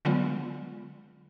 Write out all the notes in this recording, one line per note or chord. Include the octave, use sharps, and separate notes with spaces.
D3 F#3 G#3 B3 F4